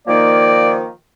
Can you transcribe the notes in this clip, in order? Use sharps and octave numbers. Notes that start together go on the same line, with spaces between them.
D#3 F3 A#3 D5